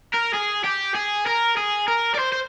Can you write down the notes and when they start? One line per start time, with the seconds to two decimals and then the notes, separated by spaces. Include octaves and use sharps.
0.14 A#4
0.34 G#4
0.65 G4
0.95 G#4
1.27 A#4
1.57 G#4
1.88 A#4
2.14 D5
2.19 C5
2.32 C5